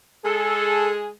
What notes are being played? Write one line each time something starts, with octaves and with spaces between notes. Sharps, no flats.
G#3 G#4 A4